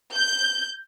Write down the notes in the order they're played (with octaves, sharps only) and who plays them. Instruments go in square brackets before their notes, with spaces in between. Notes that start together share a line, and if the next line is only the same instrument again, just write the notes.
[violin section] G6